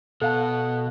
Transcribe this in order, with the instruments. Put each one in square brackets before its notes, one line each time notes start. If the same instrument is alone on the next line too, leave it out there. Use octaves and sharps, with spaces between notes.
[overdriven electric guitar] B2 [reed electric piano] A4 F5 A5 [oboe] F#5